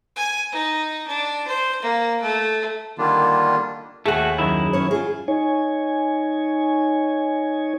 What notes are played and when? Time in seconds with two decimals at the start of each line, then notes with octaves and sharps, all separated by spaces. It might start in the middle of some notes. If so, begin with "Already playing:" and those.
0.16 G#5
0.52 D#4
1.07 D4
1.47 C5
1.82 A#3
2.22 A3
2.98 D3 D#3 G3 A#3 D4 F4
4.06 D#2 A3 F#4 G#4
4.38 F#2 D#3 E4
4.73 C#4 C#5
4.91 F4 G#4
5.28 D#4 C#5 G#5